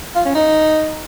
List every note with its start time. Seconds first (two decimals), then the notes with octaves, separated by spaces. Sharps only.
0.15 F4
0.25 C#4
0.35 D#4